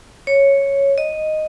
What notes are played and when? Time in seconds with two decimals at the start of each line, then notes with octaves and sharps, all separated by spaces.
0.27 C#5
0.98 D#5